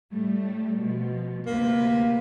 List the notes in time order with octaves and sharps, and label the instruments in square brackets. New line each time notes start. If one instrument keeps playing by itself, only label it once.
[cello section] A2 G3 A3
B2 F3
[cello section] D2 C3 B4 [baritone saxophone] A#3